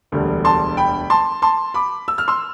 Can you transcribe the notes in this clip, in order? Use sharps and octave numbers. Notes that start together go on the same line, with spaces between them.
E1 D2 D3 G3
A5 C6
G5 B5
A5 C6
A5 C6
B5 D6
E6
F6
C6 E6